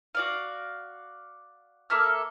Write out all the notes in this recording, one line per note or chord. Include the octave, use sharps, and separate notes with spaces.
F#4 D5 F5
A#3 A4 E5 F6